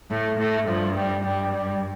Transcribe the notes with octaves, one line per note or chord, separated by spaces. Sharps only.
A2 A3
A2 A3
G2 F3
G3
G2 G3
G3